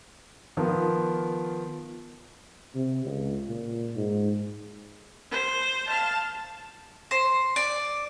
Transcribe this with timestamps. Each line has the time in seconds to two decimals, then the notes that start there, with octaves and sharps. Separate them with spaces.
0.57 D#3 F3 B3 F4
2.75 C3
3.05 C#2
3.48 A#2
3.96 G#2
5.31 C5
5.87 F5 A5
7.11 C5
7.56 D5